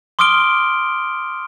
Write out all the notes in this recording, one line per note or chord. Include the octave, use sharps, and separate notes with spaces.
C6 D6 D#6 F6 D7 G7